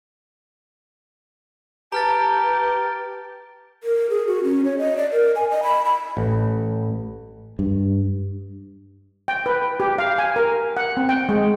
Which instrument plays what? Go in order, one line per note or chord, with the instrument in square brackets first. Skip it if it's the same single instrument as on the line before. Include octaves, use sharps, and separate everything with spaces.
[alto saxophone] G4 [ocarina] B4 [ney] A5 [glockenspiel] A#5 F6 A6
[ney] A#4
G#4
F#4
C#4
C#5
D#5
D5
A#4
G#5
D#5
B5
B5
[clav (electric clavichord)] A1
[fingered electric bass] G2
[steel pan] G5
B4
G4
F5
G#5
A#4
F#5
C4
G5
G#3